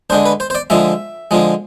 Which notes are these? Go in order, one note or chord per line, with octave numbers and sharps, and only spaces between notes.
D3 G#3 D4 C5
B4
C5
C5
D5
D3 F3 G#3 E5
D3 F3 G#3